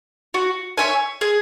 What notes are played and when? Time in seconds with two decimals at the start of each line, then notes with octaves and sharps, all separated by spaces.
0.34 F#4
0.77 C#5 E5 G#5
1.21 G#4